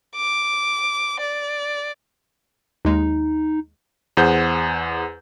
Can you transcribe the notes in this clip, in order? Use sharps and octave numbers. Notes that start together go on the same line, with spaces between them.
D6
D5
D#2 G#3 D#4
E2 G#4 C5 F#5 G6